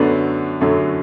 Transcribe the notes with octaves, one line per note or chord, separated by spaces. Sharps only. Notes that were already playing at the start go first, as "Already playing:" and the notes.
Already playing: F#2 D3 F#3 A3 B3 D4
F#2 D3 F#3 A3